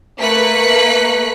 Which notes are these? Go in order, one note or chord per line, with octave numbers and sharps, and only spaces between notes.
A3 A#3 B4 F#6 B6 C#7